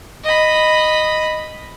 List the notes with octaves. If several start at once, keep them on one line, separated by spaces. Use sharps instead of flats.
D#5 B5